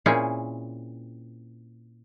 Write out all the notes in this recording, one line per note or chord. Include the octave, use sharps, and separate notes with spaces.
A#2 C4 C#4 E4 G#4